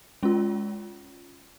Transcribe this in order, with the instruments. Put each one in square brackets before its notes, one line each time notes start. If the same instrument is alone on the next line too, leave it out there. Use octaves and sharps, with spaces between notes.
[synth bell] G#3 C#4 F4